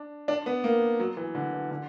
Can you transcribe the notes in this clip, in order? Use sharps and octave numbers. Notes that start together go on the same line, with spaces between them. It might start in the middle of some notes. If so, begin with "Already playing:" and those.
Already playing: D4
D4
B3
A#3
F#3
E3
D3
E3
D3